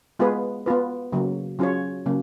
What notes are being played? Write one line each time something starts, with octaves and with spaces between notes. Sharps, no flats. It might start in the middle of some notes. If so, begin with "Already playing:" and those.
G#3 B3 F4 G#4 B4
B3 F4 B4
C#3 F#3 A#3
F#3 C#4 F4 G#4 C#5
C#3 F#3 A#3 C#4